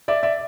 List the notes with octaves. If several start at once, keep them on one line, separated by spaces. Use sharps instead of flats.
D5 E5
D5 E5